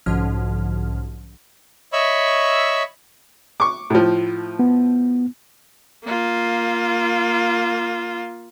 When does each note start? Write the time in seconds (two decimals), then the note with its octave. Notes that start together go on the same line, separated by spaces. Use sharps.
0.06 B1 G#2 D3 F3 C#4 F6
1.93 C#5 D#5 E5 B5 C#6 E6
3.60 C#6 D6
3.90 A2 F3
4.59 B3
6.04 A#3 F4